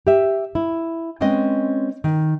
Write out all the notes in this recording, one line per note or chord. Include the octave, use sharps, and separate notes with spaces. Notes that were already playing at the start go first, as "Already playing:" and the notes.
G4 E5
E4
G#3 C4 C#4 B4 D#5
D#3